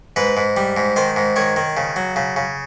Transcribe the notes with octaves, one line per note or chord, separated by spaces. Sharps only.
G#2 B4
G#2
G3
G#2
D#3 C5
G#2
D#3 C#5
D#3
C#3
F#3
C#3
C#3